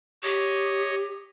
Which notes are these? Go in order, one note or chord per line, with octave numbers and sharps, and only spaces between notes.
G4 C#5 D#5